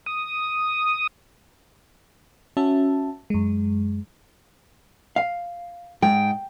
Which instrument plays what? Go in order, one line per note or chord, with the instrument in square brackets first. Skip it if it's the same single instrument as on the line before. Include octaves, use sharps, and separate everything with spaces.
[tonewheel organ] D#6
[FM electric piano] C#4 F#4 E5 A5
F#2 G#3
[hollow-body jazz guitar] F5
[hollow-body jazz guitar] G#2 [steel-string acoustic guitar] G5